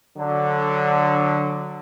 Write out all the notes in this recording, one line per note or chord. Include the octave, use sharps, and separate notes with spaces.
D3 F#3